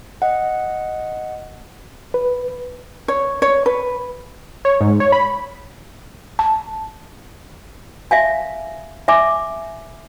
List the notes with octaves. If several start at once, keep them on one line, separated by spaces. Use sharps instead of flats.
D#5 F#5
B4
C#5
C#5
B4
C#5
G#2
C#5
B5
A5
E5 F5 G#5
E5 G#5 D6